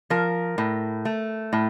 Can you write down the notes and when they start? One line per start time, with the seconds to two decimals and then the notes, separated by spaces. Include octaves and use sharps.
0.10 F3 A#4
0.58 A2
1.05 A3
1.53 A2